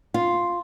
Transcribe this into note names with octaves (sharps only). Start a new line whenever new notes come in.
F4